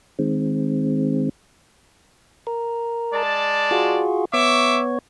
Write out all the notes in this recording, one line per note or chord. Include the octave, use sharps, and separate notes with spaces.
D#3 G#3 C4
A#4
G#3 D5 A5
F4 F#4 G#4
B3 C#5 E5 C#6 D6